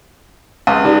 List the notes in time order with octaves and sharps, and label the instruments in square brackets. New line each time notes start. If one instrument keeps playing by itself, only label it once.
[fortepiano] C#2
[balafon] D#4 G4 D5